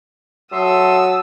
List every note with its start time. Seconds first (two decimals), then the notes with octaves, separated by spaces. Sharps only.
0.52 F#3 A4 E5 A5 C6 D#6 E6